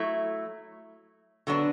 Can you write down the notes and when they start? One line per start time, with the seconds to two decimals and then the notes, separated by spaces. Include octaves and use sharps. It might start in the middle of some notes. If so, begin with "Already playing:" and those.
Already playing: F#3 A3 E4
1.47 D3 F#3 B3 D4